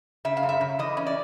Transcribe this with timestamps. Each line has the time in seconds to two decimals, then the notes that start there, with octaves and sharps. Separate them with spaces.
0.25 C#3 E5
0.37 F5
0.43 F#2
0.49 E5
0.61 C#3
0.79 E3 D#5
0.97 C#4
1.06 D5